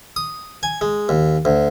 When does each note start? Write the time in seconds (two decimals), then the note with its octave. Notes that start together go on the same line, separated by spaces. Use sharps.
0.16 D#6
0.63 G#5
0.81 G#3
1.09 D#2
1.45 D2